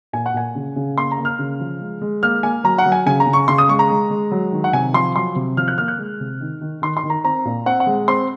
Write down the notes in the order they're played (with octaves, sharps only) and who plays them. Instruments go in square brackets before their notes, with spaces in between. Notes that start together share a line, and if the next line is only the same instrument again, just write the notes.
[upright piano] A#2 G#5
F#5
A#2 G#5
C#3
C#3
A#3 C6
A#5
A#3
F6
C#3
F3
G#3
G#3
A#3 F6
A#3 G#5
F#3 A#5
F#5
F#3
G#5
C#3 G#5
A#5
C#3
C#6
C#3 C6
D#6
G#3 C#6
A#5
G#3
G#3
F#3
D#3
F#5
C3 G#5
F3 C6
F#3 C6
C3
F3 F6
F#6
A#3 F6
F#6
G#3
C3
D#3
D#3
D#3 C6
C6
D#3
A#5
C4 A#5
A#2
C4 F#5
F#5
G#3
C4 C6